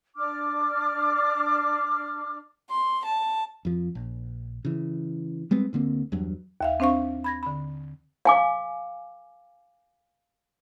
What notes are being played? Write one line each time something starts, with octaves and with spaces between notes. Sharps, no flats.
D4 D6 F6
C6
A5
F2 F3
A#1
C#3 E3
G3 G#3 B3 C4
D2 D3 A#3 C4
E2 G2 F#3
D#2 E5 F5
C4 D4 C5 F5 C#6
B5 G#6 A#6
D3 B5
F5 G#5 D6